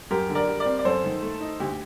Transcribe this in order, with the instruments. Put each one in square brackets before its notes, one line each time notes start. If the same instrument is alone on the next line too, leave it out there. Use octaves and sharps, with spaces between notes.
[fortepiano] F#2 [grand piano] G4 A#4
[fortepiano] D3
[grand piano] A#4 D5
[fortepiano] G3
[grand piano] A#4 D5
[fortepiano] C4
[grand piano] D5
[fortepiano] F#2 [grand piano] A4 C5
[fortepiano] D#3
A3
D#4
[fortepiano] D2 [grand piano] G4